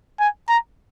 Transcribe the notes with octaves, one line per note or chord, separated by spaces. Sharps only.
G#5
A#5